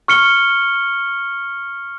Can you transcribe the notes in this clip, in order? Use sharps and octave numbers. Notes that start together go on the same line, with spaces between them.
C#6 F6 C#7 G7